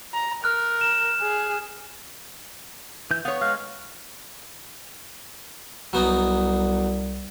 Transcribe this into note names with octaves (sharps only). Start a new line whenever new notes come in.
A#5
A#4 F6 F#6
E7
G#4
E3 G6
B3 C#5 F5
G#3 F5 F#6
C2 F#3 B3 D#4